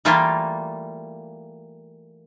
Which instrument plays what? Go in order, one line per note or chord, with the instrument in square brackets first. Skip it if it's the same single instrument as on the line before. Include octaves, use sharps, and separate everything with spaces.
[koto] E3 G3 A3 A#3 F4